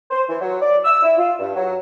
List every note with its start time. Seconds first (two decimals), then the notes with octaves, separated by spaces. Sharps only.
0.10 C5
0.28 E3
0.41 F#3
0.61 D5
0.84 E6
1.02 E4
1.18 F4
1.39 G2
1.55 F#3